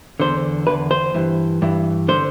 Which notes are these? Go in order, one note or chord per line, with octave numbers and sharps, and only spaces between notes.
E2 D3 C5
E2 D3 B4
C5
G2 E3
G2 E3
D3 C5